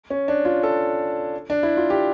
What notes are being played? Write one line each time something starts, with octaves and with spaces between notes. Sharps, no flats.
C#4
D4
F4
A4
D4
E4
F4
G4